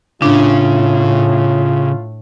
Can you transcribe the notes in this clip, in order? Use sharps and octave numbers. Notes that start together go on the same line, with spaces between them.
A2 C#3 D4 F4